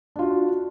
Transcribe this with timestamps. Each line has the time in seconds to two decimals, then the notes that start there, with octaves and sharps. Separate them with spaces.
0.16 D4
0.19 F4
0.22 F#4